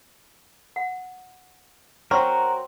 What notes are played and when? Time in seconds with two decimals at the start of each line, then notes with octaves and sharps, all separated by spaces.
0.76 F#5
2.11 F#3 C4 F#4 A#4 C6 C#6